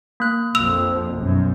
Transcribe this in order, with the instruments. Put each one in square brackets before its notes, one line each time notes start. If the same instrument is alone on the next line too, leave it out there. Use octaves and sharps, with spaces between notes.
[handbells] A#3 F#6
[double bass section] A#1 F2 F3 [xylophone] E6 F7
[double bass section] B1 F#2